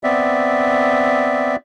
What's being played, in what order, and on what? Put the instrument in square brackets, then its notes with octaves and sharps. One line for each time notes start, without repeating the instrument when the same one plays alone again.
[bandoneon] B3 C4 D5 E5